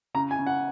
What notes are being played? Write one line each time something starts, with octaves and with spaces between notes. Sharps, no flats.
C#3 A#5
G#5
C#3
F#5